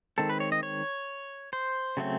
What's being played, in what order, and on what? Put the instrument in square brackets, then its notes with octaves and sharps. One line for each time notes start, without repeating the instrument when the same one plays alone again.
[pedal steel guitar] D#3 G#3 C4 A4
B4
C#5
D#5
C#5
C5
C#3 F#3 A3 C4